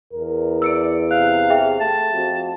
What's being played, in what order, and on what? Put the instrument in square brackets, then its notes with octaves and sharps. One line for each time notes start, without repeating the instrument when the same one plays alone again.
[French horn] E2 [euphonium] A#4
[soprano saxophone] D5 [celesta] E6 C#7 D7
[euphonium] C3 [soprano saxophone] F5 [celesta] F#6
[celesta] G#4 E5 G5
[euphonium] A3 [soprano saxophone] A5
[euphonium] F2 [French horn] F#4